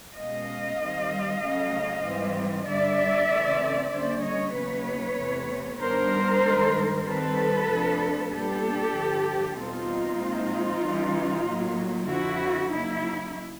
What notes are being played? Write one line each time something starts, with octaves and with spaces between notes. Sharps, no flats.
B2 G#3 C#4 D#5 F5
D#3 G3 C4
C#3 F#3 A3 C#4
G#2 E3 G3 C4
G2 D3 G3 D5 E5
C#3 E3 A3 C4
D3 G3 A#3 C#4 C5 D5
C#5 D#5
E2 C#3 F#3 A#3 D#4 B4 C#5
E2 C3 E3 A3 C4
G2 D#3 G3 B3 D4 A#4 C5
G2 D#3 G#3
D#3 G3 C4 A4 B4
F2 C3 F3 A3 D4
A#2 G3 B3 D4 G4 A4
G2 D3 F3
E2 B2 G3 C4 D#4 F4
A#2 F3 G#3 C4
C#3 E3 G3
A2 F#3 A#3
F2 D3 F3 E4 F#4
C#3 F#3 A#3 D#4 E4